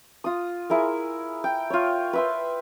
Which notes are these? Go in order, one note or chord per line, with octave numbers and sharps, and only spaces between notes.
F4 D#6
E4 G#4 A#4
G5
F4 C#5
B4 E5 C6